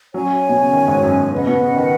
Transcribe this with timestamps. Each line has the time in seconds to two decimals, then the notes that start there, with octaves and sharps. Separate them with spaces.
0.14 F#3 C#4 F#4 C#5 G#5
0.49 B2
0.61 C#3
0.73 D#3
0.88 G#2
1.03 F#2
1.18 F#2
1.32 C#3 B4 D#5 F#5
1.46 B2
1.62 C#3
1.76 D#3